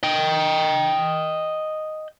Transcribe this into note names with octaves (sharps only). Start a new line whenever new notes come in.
D#5 G5